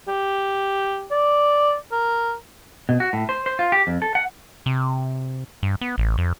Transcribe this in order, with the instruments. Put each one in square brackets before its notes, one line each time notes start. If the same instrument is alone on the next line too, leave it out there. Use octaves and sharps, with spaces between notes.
[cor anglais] G4
D5
A#4
[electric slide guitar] B2
F#4
A2
C5
C5
F4
G4
F2
A4
F#5
[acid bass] C3
G2
B3
A1
F2